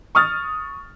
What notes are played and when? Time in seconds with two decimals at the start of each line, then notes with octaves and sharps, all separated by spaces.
0.15 C#6 D#6 F6 A6